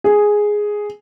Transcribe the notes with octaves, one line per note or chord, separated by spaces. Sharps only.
G#4